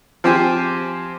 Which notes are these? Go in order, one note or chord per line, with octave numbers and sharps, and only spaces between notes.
F3 C4 G4 C5 G#5